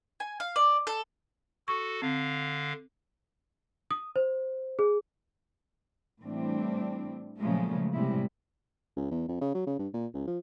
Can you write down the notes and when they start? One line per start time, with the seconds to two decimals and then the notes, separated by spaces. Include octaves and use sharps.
0.20 G#5
0.40 F5
0.56 D5
0.87 A4
1.68 F#4 A4 C#6
2.02 D3 C4 F5
3.91 D#6
4.16 C5
4.79 G#4
6.21 A2 E3 G3 C4 D4
7.39 A#2 C#3 F3 F#3 G#3 A3
7.93 A2 C3 G3 G#3 E4
8.96 C#2
9.11 E2
9.28 F2
9.41 C#3
9.54 F#3
9.66 C#3
9.79 G2
9.93 A#2
10.14 C#2
10.27 F3